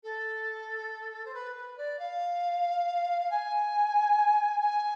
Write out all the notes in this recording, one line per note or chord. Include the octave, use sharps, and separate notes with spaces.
A4
C5
B4
B4
D5
F5
G#5
G#5